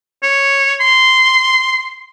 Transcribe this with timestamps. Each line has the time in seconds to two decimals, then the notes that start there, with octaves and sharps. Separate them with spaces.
0.23 C#5
0.80 C6